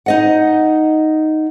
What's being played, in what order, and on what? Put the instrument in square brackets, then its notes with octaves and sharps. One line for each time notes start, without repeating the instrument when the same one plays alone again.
[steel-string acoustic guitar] D#4 D#5 F#5